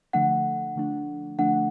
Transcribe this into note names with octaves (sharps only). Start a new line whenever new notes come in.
D3 F3 A3 D4 F#5
D3 F3 A3 D4
D3 F3 A3 D4 F#5